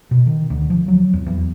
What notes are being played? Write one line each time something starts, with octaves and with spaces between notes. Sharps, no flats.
B2
D#3
D2
F3
F#3
E2
E2